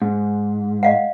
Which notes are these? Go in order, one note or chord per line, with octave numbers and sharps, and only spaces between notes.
G#2
D#5 F5 F#5